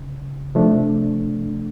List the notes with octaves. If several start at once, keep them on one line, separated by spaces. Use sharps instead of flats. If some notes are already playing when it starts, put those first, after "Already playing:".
Already playing: C#3
C3 F3 A3 D4